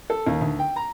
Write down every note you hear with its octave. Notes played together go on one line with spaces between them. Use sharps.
A4
D#2
D2
G5
A#5